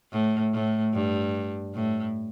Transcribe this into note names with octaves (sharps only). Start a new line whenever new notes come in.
A2
A2
G2
A2